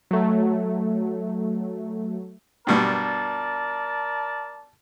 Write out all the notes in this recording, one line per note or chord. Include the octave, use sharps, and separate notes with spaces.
F#3 A3
G2 B2 G3 A#4 D5 A5